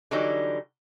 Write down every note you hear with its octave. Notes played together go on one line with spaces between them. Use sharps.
D3 E3 F#3 G3 D#4